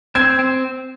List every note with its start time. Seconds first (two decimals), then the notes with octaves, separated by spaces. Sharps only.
0.15 C4 G#6
0.39 C4